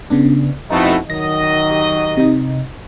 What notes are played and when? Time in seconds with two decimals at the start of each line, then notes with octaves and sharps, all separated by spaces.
0.10 C#3 B3 D4
0.70 F2 B2 A3 D#4 E4
1.10 D#3 F#3 D#5 A#6
1.71 G4
2.17 C3 D#4